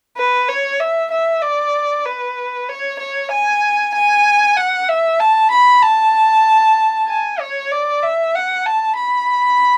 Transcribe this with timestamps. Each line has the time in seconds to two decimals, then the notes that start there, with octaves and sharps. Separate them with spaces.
0.17 B4
0.48 C#5
0.80 E5
1.11 E5
1.42 D5
2.05 B4
2.69 C#5
2.99 C#5
3.32 G#5
3.95 G#5
4.57 F#5
4.88 E5
5.20 A5
5.51 B5
5.83 A5
7.08 G#5
7.40 C#5
7.72 D5
8.03 E5
8.35 F#5
8.66 A5
8.97 B5